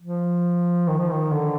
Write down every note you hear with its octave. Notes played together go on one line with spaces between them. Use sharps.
F3
D#3
F3
D#3
D3